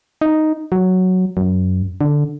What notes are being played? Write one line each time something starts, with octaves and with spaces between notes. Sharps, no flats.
D#4
F#3
F#2
D3